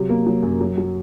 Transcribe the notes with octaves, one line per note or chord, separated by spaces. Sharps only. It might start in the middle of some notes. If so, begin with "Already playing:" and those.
Already playing: C3 F#3
A#3
F#3
F#2
F#3
F#3